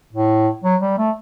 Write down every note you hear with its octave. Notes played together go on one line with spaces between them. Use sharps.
A2
F#3
G3
A3